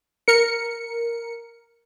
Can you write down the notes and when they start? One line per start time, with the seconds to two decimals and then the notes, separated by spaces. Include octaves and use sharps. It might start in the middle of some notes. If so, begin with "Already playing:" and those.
0.28 A#4 C#7